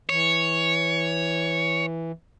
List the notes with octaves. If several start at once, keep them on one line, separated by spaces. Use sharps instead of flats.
E3 C#5